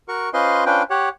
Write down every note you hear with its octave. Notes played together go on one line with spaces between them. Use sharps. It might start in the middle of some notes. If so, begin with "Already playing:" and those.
F#4 A#4 C#6
C#4 F4 B4 C5 D#5 C6
C#4 D4 F4 B4 C5 G5
G4 C#5 F#5